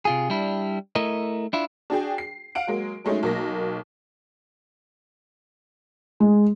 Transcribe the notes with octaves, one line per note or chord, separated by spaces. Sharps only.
C3 F4 G#4
G3 D4 E4
A3 E4 A#4 D#5
D4 E4 F4
D4 F#4 G#4 G5
C7
F5 F#5 D7
F#3 G#3 A#3
F#3 G#3 A3 C#4 D#4
B1 A#3 A#6
G#3